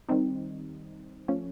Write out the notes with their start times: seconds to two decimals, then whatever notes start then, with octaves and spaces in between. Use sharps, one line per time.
0.09 D#3 G3 C4 D#4
1.28 F3 A3 C#4